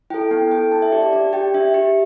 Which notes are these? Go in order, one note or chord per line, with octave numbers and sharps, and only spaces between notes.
E4 A4 G5
B3 G5
E4 A4 G5
D4 A5
E5
G4 D5
D5
D4 D5
G4 G5
D4 E5
G4